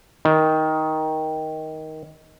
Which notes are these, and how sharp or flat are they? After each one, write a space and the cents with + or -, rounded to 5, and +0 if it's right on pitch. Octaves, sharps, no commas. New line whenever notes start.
D#3 +10